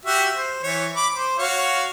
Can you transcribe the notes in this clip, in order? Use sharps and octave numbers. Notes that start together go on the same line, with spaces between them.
F#4 G4 E5
C5
E3 C#5
B5 D6
C5
F#4 C#5 F5